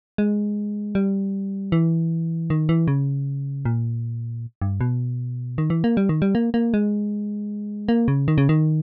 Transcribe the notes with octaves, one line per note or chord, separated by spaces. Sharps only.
G#3
G3
E3
D#3
E3
C#3
A#2
G2
B2
D#3
E3
A#3
G3
D#3
G3
A#3
A#3
G#3
A#3
C#3
D#3
C#3
D#3